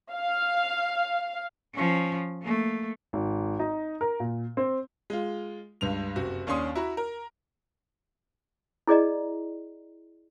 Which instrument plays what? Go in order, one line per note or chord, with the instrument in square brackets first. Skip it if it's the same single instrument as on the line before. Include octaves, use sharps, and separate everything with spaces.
[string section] F5
[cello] F3 C#4
A3 A#3
[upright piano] G#1
D#4
A#4
A#2
C4
[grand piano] G#3 F4
C#2 G2 F7
F#1 C3 F#4
D#2 C#4 D4 C6 D#6
E4 F#4 A#5 B5
A#4
[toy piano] E4 G#4 D5 D#5 A#5